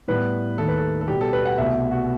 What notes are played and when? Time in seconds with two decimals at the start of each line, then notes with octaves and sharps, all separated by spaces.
0.08 A2 G3 B3 B4
0.58 D#2 D#3 A3 A4
0.68 B4
0.78 A4
1.01 A4
1.08 B2 G3 B3 G4
1.21 A4
1.33 B4
1.45 F#5
1.58 C2 B2 A3 E5
1.91 F#4